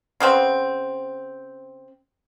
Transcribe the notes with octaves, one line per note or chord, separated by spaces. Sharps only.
C#3 B3 C4